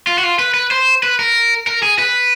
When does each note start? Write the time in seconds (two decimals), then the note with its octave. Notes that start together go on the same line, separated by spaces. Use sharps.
0.07 F4
0.18 F#4
0.23 F4
0.39 B4
0.54 B4
0.71 C5
1.03 B4
1.19 A#4
1.67 A#4
1.83 G#4
1.99 B4